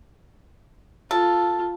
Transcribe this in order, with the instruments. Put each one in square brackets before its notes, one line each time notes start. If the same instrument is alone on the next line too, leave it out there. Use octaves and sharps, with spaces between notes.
[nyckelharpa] F4 [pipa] A4